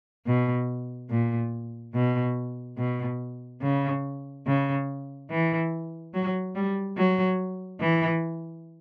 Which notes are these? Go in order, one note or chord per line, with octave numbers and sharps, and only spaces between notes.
B2
A#2
B2
B2
C#3
C#3
E3
F#3
G3
F#3
E3